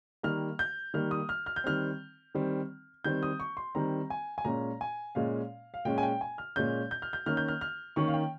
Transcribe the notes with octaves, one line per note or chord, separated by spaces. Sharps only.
D#3 G3 A#3 F6
G6
D#3 G3 A#3 F6
D#6
F6
F6
G6
D#3 G3 C4 F6
D#3 G3 C4
D#3 G3 C4 G6
D#6
C#6
C6
D#3 G3 C4 A#5
G#5
G#5
A#2 G#3 C#4 A#5
G#5
A#2 G#3 C#4 F5
F5
A#2 G#3 C#4 G5
G#5
G5
G#5
F6
A#2 G#3 C#4 G6
G6
F6
G6
D#3 A#3 C#4 F6
G6
F6
F6
D#3 A#3 C#4 C#6
F5
G5